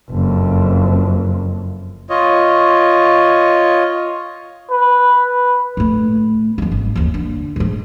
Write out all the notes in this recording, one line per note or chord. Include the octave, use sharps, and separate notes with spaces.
F#1 F2
F4 C#5 D#5
B4
A2 A3
F#2 G#3
G#1
F#1 D#2
D3
A2 G#3